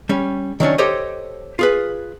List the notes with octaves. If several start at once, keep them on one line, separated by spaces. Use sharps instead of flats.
G3 C#4
D#3 F#3 C#4 D4
G4 A4 C5 C#5 D#5
F4 G#4 B4